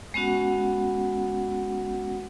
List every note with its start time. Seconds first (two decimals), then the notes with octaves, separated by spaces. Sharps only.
0.14 G#3 B3 C#4 F#4 F#5